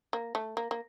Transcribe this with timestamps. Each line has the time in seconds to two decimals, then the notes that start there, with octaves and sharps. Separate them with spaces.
0.13 A#3
0.35 A3
0.57 A#3
0.71 A#3